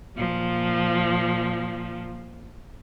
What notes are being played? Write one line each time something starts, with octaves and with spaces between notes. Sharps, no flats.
A#2 F3